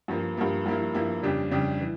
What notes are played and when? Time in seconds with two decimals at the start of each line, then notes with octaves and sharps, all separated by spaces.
0.08 G2 F3 A#3
0.37 G2 F3 A#3
0.66 G2 F3 A#3 E4
0.95 G2 F3 A#3 E4
1.23 F2 C#3 G3 D4 G4
1.51 F2 C#3 G3 D4 G4
1.80 E3